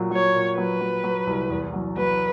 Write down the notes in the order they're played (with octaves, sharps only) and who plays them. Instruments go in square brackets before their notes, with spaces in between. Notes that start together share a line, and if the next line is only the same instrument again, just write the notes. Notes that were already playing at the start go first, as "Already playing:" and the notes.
Already playing: [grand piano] A#2 F#3
[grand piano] F#3 [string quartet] C#5
[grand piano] A#2
[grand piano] F#3 [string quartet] B4
[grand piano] F#3
F#3
C2
E2
F#3
[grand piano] F#3 [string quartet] B4